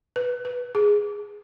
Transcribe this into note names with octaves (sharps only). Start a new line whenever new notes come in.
B4
B4
G#4